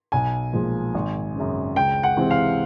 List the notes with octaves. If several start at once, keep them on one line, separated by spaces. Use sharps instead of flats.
B1 G#5
A#2 F3 G#3
G#1
F#2 C#3
C#2 G5
F#5
C3 E3 G#3 C4
F5